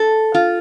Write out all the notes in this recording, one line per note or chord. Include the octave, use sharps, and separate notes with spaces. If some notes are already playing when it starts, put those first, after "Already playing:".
Already playing: A4
F4